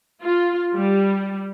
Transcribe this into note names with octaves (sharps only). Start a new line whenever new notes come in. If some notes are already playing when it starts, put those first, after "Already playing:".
F4
G3